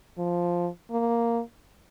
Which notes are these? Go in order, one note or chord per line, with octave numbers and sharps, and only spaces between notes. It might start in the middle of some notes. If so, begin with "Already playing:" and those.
F3
A#3